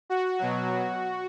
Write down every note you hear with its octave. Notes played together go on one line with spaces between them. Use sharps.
F#4
B2 F#3